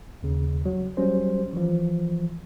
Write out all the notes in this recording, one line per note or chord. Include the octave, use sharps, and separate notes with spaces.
D#2 C#3
F#3
F#3 G3 C#4 C5
E3 F3